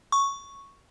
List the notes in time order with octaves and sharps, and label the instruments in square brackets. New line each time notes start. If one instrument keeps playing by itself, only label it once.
[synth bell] C#6